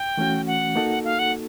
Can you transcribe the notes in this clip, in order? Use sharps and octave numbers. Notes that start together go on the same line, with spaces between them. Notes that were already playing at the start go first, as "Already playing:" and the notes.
Already playing: G5
E3 A3 C#4 F#4
F#5
A#3 D#4 F#4 A4
F5
F#5